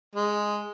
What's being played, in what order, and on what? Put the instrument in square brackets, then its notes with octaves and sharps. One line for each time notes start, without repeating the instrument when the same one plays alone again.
[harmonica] G#3